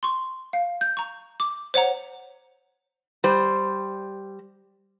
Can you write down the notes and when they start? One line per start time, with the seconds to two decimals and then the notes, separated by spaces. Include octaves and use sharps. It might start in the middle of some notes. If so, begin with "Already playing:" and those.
0.03 C6 C#6
0.53 F5
0.81 G6
0.97 A#5 C#6
1.40 D6
1.74 C5 C#5 F#5 A#5
3.24 G3 C5